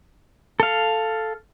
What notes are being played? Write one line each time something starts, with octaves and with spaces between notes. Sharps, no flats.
A4 F5